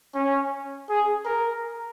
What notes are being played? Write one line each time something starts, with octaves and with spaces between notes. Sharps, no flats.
C#4
G#4
A#4